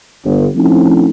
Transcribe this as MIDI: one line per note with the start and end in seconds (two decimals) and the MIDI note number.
0.25 0.46 31
0.56 1.09 53
0.56 1.09 57
0.56 1.09 60
0.56 1.09 61
0.56 1.09 63
0.56 1.09 64